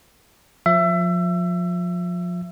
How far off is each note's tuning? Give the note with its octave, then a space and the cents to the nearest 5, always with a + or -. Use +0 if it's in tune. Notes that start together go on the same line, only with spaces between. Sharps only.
F3 +25 E5 +25